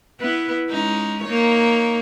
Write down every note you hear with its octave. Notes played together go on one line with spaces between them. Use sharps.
B3 E4 B4
G#3 C#4 D#4
A#3 D#4 C#5